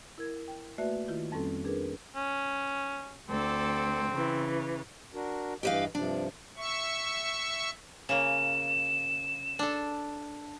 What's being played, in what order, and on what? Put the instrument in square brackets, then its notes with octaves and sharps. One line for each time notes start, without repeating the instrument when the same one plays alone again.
[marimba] E4 A#4 G#6
G5
A3 A#3 F#4 B4 D5 E5
D#3 E4 F4
F2 G3 C4 C#4 A4
D4 G#4 A#4 B4
[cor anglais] C#4
[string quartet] D2 A4 D5 [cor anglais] C4
[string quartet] C#3 E3
[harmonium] D4 F#4 A#4
[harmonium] G2 E3 D#5 [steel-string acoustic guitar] G4 B4 F5
[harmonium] G2 C3 F3 [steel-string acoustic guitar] D4
[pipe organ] E5 C#6
[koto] C#3 A#3 [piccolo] E7
[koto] D4 A4